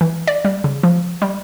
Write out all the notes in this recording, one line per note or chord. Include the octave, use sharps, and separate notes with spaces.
E3
D5
G3
C#3
F3
G3